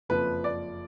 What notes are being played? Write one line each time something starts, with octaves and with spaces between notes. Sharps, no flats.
F#1 F2 F3 B4
D5